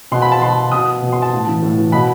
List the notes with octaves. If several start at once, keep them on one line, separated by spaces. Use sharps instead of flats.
B2 C6
B5
A5
B2 C6
B2 D#6
B2
C6
A5
A2
E3
A2
E3
B2 B5